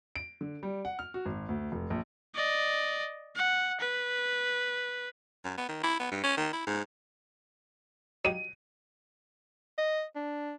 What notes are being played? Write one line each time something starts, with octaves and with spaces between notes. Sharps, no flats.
D7
D3
G3
F#5
F6
F#4
G#1
D2
F1
A#1
D5 D#5
F#5
B4
F#2
B3
D#3
E4
B3
G2
C#4
D#3
E4
G#2
F#3 D#4 G4 D#7
D#5
D4